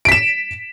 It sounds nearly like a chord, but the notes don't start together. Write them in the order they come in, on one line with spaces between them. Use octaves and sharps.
D7 B6 E7